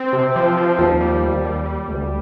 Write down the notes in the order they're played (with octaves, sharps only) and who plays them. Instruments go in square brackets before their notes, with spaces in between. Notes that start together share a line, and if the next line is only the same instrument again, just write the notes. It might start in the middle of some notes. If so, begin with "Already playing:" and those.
Already playing: [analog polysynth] C4
C3
F3
F3
[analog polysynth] D#2 [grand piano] F3
[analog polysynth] G3
D#2
G3
G3
D2